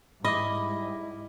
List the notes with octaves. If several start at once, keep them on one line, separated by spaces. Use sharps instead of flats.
G#2 G3 E4 D#5 B5 D6